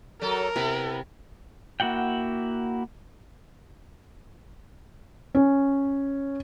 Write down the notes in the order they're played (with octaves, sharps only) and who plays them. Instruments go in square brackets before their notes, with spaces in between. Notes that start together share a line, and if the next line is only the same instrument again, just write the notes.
[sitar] F#3 A4 [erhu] A#4
[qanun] C3 [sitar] B3 E4 B4
[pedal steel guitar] A#3 E4 F#4 F#5 G5
[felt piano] C#4